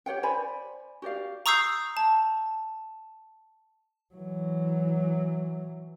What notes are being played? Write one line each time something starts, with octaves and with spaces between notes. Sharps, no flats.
G4 C#5 F#5 G5
C5 D5 G#5 B5
F#4 G4 D5 F5
A#5 C#6 D#6 E6 G6 C7
A5
E3 F#3